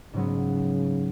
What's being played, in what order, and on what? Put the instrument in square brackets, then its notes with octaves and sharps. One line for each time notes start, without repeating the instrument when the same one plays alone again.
[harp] G#2 F#3 B3 [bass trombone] C#3